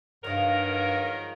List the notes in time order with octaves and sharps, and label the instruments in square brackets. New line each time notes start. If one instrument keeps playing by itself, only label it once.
[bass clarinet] G2 [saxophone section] D#3 F#3 A#4 [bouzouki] F3 G#3 F5